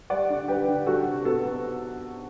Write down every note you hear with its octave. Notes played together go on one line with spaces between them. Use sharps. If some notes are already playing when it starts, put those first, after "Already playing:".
G3 D5 F#5
D3
G3 G4 B4
D3
G3 F#4 A4
C3
B3 F#4 A4
B3